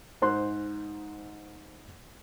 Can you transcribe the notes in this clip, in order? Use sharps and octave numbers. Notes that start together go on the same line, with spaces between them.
G#2 D#4 C5 C6 F#6